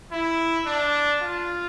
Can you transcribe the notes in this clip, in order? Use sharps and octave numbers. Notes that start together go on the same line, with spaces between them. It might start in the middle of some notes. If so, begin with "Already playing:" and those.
E4
D4
F4